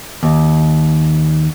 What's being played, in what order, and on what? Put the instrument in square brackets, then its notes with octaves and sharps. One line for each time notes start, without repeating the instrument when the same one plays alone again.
[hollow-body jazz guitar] D#2